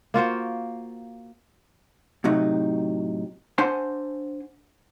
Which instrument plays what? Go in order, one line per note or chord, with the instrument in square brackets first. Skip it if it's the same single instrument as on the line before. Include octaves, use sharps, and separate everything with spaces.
[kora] A#3 F4 F#4 C5
[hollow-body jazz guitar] A2 C3 F#3 D#4
D4 C5 F#5 G#5 C6